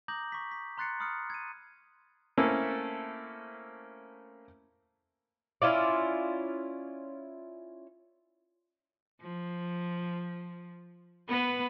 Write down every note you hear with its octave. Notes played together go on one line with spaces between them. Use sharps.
A#5 D6 D#6 G6 A#6 F#7
C#6 B6
B6
A#5 C6 F#6 A6 C7 C#7
B5 D#6 F6 C#7
G#6 D#7
A3 A#3 C4 C#4 E4 A4
C#4 E4 F4 D5
F3
B3 B4